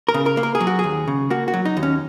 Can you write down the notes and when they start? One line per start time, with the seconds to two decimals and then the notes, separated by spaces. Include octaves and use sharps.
0.09 A#4
0.14 C#3
0.26 A#4
0.37 A#3
0.43 A#4
0.55 G#4
0.60 F#3
0.67 F#4
0.79 D#2 G#4
1.07 C#3
1.30 A#3 F#4
1.48 F#4
1.54 F#3
1.65 D#4
1.77 D#2
1.83 C#4